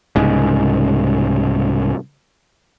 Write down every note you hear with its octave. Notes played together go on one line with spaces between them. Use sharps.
C2 G#2 C#3